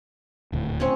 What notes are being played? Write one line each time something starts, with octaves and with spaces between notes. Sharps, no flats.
D#1 D2 A2
C4 C#4 C#5